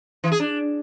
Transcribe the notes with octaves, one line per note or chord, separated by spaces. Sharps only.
E3
G#4
D4